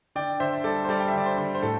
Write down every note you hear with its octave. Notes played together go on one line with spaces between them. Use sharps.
D3 D5 G5
D3 C5 E5
G3 A4 D5
C5
G3 A4 D5
G5
E5
D3 D5
C5
D3
C5
A2 A4